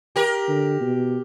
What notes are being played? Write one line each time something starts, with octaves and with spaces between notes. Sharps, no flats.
G4 A#4
D3
B2